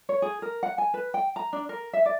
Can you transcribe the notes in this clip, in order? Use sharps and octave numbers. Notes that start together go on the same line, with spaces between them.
C#5
G#4
A#4
F#5
G#5
B4
G5
A#5
D4
A#4
E5
D5